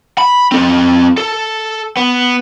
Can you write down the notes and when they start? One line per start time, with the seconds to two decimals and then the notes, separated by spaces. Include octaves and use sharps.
0.18 B5
0.52 C4 A4
1.18 A4
1.97 B3